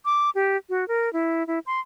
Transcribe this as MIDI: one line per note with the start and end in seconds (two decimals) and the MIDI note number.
0.05 0.30 86
0.35 0.57 67
0.70 0.87 66
0.88 1.12 70
1.13 1.46 64
1.47 1.59 64
1.66 1.80 84